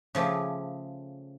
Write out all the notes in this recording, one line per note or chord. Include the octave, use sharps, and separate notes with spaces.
C#3 F3 A3 G4 G#4